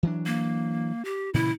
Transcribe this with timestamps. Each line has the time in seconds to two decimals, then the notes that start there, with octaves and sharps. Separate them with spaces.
0.03 E3 F#3 D4
0.26 A#3
1.05 G4
1.34 A#2 C#3 E3 E4